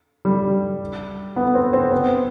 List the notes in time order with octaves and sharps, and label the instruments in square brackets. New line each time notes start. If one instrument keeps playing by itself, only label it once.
[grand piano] G3
B3
C4
C4
B3